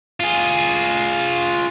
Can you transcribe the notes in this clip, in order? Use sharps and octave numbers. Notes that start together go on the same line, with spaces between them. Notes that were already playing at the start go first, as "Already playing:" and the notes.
F4 G#4